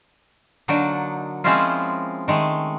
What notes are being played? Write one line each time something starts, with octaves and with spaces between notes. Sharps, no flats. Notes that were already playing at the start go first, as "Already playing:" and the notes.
D3 F#3 A#3 D4 D#4
F3 G#3 C4 C#4 E4 F4
D#3 G#3 A3